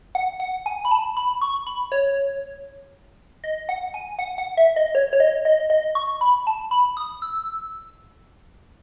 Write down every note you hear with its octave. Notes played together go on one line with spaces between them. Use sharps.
F#5
F#5
G#5
B5
A5
B5
C#6
B5
C#5
D#5
F#5
G#5
F#5
F#5
E5
D#5
C#5
C#5
D#5
D#5
D#5
C#6
B5
A5
B5
D#6
E6